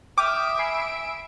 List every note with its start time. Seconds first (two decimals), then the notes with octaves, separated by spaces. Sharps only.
0.18 E5 G5 D6 D#6 F6 D7
0.59 G#5 B5 C7